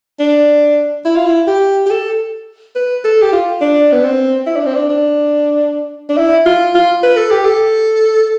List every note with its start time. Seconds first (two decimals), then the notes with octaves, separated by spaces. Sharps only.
0.20 D4
1.05 E4
1.16 F4
1.26 E4
1.47 G4
1.86 G4
1.91 A4
2.76 B4
3.04 A4
3.22 G4
3.33 F4
3.61 D4
3.92 B3
4.04 C4
4.47 E4
4.57 D4
4.66 C4
4.75 D4
4.90 D4
6.09 D4
6.18 E4
6.46 F4
6.75 F4
7.03 B4
7.17 A4
7.31 G4
7.45 A4